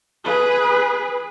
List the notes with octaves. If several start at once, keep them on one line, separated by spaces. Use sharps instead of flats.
G#4 B4